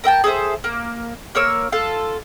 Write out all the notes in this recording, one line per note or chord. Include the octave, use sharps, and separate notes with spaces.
A#4 E5 G5 A5
G#4 A4 C5 E5
A#3
A#3 A#4 C#5 E6
F4 A4 A5